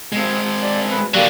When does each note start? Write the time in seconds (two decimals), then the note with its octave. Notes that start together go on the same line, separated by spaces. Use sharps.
0.12 G#3 C4
0.62 D5
0.90 B4
1.15 D3 F#3 A#3 G4 D5